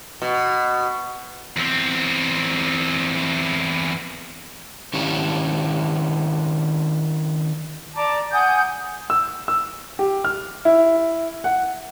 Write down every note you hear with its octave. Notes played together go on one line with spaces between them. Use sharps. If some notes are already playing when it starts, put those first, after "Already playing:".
B2
E2 C4
D#3 C#4 D4 E4 G4 C#5
D5 A5 A#5 D6
F#5 G#5 D#6 G6
E6
E6
G4
F6
E4
F#5